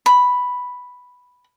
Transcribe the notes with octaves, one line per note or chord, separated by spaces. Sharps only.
B5